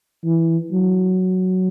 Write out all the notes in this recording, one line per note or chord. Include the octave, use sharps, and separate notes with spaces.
E3
F#3